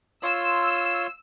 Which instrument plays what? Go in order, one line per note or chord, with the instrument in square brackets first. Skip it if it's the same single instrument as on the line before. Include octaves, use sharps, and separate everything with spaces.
[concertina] F4 C#5 C6 [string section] E6